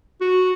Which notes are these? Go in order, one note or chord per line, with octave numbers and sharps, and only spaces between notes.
F#4